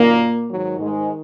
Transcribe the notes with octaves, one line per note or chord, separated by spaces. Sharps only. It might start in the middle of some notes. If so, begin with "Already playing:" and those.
Already playing: F#2 A#2 D#3 A#3
G#2 D#3 F#3
G#2 G#3